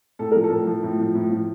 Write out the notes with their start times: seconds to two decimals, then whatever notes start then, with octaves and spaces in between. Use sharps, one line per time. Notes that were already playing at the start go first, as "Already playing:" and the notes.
0.19 A2 A4
0.32 F3 A#4
0.44 A4
0.50 A2
0.67 F3
0.83 A2
0.99 F3
1.15 A2
1.31 F3